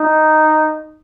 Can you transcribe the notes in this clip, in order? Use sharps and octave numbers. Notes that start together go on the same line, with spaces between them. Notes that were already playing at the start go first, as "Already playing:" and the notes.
Already playing: D#4